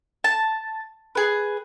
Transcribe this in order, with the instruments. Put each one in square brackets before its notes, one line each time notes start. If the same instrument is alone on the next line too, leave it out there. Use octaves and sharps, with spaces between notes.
[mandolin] A5
G#4 B4